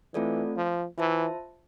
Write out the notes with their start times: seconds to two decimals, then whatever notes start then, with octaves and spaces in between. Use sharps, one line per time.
0.14 E3 A3 C4 F4 A4 D5
0.57 F3
0.98 E3 F4 C5 E5 A5